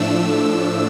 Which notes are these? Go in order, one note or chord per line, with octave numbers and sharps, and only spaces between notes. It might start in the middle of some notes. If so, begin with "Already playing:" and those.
Already playing: A2 F3 A3 D4 E6